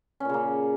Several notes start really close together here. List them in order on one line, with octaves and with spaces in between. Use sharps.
C#4 A#2 C#3 A#3